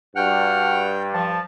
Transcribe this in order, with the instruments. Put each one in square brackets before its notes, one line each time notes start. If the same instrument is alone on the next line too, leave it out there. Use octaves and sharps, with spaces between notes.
[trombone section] G2 [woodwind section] D4 F#4 F6 [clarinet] F#5 [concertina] G5
[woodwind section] F3 [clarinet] A5